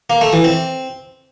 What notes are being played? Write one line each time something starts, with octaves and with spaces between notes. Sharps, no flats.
A#3
A3
E3
C4